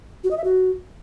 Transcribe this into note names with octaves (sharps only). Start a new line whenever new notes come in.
F#4
D#5
E5
F#4